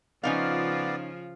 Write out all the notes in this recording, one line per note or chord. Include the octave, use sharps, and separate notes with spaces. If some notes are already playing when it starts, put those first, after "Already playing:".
C#3 F3 B3 C#4 D#4 F4 D5 F5